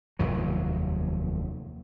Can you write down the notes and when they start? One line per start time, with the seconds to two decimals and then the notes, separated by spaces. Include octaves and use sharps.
0.19 F1 D#2 F#3